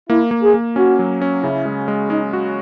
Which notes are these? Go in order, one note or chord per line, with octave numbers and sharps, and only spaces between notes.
A#3 E4
A#3
G#4
A#3
C#4 F#4
F#3
C#4
C#3 E4
G#3
G#3
G#3 D#4
F#4